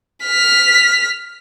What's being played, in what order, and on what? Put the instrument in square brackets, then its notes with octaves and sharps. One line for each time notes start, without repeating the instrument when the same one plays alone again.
[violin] F6 B6